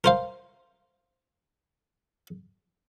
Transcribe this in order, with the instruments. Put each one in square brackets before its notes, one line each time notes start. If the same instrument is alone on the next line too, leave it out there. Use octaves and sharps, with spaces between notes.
[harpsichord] A#4 C5 F5